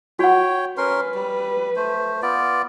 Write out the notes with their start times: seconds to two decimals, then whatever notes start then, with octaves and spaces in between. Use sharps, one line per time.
0.19 F#4 C#5 F#5 G5
0.78 C#4 A#4 B4 C6
1.15 G3
1.76 A3 C5
2.22 B3 F4 D5